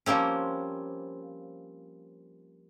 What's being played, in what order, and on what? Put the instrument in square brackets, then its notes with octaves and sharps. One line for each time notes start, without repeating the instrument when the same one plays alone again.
[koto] F3 G3 A#3 C4 C#4